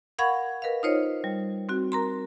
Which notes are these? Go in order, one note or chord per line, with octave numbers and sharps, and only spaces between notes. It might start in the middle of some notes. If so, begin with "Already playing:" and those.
A#4 F5 F#5 B5 C#6 G#6
A#4 B4 D#5 F5
D#4 F4 C5 C#5 D#5
G3
C4 F#4
A#4 A#5 C6